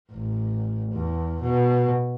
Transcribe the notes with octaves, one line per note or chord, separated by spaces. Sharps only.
A1
E2
B2